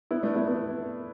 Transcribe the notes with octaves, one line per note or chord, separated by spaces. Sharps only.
B3 E4
A3 D4
B3 E4
B3 E4